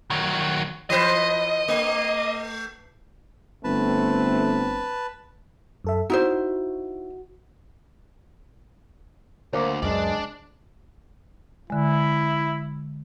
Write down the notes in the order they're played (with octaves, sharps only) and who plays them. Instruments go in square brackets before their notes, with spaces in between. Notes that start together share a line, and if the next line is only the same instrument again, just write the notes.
[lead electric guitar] D#3 F#3
[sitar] E3 B4 C5 [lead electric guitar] D#5
[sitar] A3
[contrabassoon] G1 [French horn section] A3 C4 [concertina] B4 A5
[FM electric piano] F#2 A4 E5
[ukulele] D#4 E4 C5 [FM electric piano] F#4
[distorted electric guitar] D2 [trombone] A#3 [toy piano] C5 D6
[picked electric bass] C#2 F#2 [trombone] G#3 [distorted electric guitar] D4 D5
[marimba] D3 G#3 [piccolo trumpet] E4